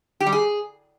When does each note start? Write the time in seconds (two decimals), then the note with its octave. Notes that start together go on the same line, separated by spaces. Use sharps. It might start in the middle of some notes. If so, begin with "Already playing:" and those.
0.20 G4
0.26 G3
0.33 G#4